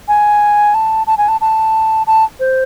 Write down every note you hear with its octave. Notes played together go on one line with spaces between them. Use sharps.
G#5
A5
A5
G#5
A5
A5
A5
C5